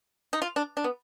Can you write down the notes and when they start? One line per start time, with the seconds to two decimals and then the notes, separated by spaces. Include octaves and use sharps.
0.33 D#4
0.42 F4
0.56 D4
0.77 D4
0.84 B3